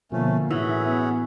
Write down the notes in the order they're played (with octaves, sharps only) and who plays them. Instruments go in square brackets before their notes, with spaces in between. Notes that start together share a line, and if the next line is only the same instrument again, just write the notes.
[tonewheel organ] B2 F3 [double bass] D3 A#3 [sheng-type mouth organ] A3 C#4
[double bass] A2 [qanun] E3 [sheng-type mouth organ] C#4 F#4 G#4 [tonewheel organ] E5
[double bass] B3